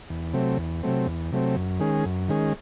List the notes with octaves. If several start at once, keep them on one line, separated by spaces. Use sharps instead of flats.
E2
C3 F#3 A3 C4
E2
C3 F#3 A3 C4
E2
C3 F#3 A3 C4
F#2
D#3 G#3 C#4 G#4
F#2
D#3 G#3 C#4 G#4